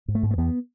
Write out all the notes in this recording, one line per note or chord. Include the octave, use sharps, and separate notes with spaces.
G#2
A3
G#2
A3
E2 B3